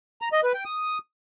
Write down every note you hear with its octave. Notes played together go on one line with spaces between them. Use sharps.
A#5
D#5
B4
G5
D#6